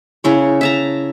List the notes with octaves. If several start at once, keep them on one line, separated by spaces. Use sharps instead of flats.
C#3 E4 C#5
E5 A5 A#5